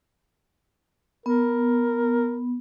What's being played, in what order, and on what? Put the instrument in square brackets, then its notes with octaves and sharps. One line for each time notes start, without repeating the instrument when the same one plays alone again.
[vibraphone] B3 [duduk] A#4